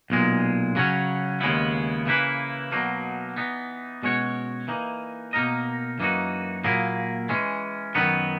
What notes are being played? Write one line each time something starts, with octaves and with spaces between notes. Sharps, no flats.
B1 A#2 G#3
C#3 F#3 C#4
D#2 C#3 G#3 B3 E4
C#3 E3 A#3 E4 B4
B2 F#3 A#3 D#4
E3 B3 D#4
B2 G#3 C#4 F#4 C#5
E3 A#3 D#4
B2 A#3 D#4 A#4 D#5
F#2 E3 A#3 D#4 F#4
A#2 F#3 A#3 E4 G#4
E3 G#3 C#4
F#2 D#3 F#3 B3 D#4